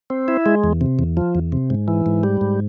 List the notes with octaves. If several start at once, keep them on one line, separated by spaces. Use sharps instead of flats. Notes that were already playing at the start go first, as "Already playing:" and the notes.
C4
E4
G#3
E2
C3
E2
F3
E2
C3
G#2
E3
G#2
G3
G#2